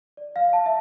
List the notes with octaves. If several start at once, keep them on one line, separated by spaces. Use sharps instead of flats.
D5
F5
A5
E5